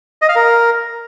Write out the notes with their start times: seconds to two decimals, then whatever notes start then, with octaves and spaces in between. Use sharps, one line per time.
0.22 D#5
0.29 F5
0.36 A#4